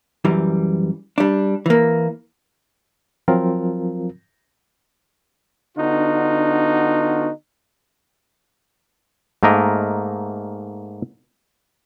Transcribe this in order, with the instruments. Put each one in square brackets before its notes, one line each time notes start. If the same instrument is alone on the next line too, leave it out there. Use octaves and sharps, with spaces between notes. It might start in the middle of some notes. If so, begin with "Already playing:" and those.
[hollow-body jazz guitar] F#2 E3 G3
G3 D4
E3 A#3
[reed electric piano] F3 F#3 C4 F4 A#4
[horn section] D3 B3 D4 D#4 F4 F#4
[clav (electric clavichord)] G#2 A3 A#3 A#4 D#5